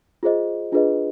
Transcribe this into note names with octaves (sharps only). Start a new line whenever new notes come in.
F4 G#4 C5 D#5
D4 F4 G#4 B4 D#5